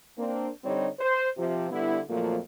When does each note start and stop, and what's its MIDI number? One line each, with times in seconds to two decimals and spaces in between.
0.18 0.49 58
0.18 0.49 60
0.18 0.49 62
0.64 0.88 50
0.64 0.88 55
0.64 0.88 60
0.64 0.88 63
0.64 0.88 67
0.64 0.88 73
0.99 1.28 72
1.37 1.68 48
1.37 1.68 53
1.71 2.01 50
1.71 2.01 55
1.71 2.01 59
1.71 2.01 64
2.09 2.38 41
2.09 2.38 46
2.09 2.38 53
2.09 2.38 54
2.09 2.38 57
2.09 2.38 58